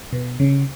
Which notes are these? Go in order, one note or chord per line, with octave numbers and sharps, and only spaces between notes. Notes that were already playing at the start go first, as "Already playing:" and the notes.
B2
C#3